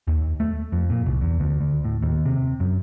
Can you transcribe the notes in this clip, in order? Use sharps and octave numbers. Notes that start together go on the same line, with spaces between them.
D#2
A3
F2
A#2
C2
E2
D2
D2
A2
D#2
C3
F#2